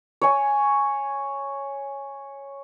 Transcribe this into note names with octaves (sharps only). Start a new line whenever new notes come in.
C#5 G#5